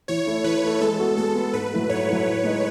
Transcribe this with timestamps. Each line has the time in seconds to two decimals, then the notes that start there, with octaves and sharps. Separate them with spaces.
0.08 E3 C#5
0.26 A3 E4 A4
0.44 E3 B4
0.63 A3 E4 A4
0.81 G#3 A4
0.99 B3 F#4 B4
1.17 G#3 A4
1.35 B3 F#4 B4
1.53 G#2 B4
1.72 F#3 A3 E4 A4
1.89 G#2 C#5
2.08 F#3 A3 E4 A4
2.27 A2
2.44 G#3 D#4 A4 D#5